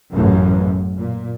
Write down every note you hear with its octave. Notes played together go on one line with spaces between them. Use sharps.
A1 F#2
A#2